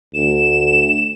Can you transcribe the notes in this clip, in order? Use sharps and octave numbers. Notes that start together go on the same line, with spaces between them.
D2 E7